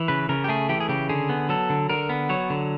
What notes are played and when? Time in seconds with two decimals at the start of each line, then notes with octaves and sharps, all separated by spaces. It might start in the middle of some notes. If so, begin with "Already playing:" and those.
Already playing: E3
0.08 C#3 B4
0.29 C#3 A#4
0.44 G4
0.48 A3 G#4
0.69 E3 G4
0.80 G#4
0.89 C#3 G4
1.09 D3 G#4
1.29 B3
1.49 F#3 A4
1.70 D3
1.89 D3 A#4
2.09 B3
2.29 F#3 C#5
2.50 D3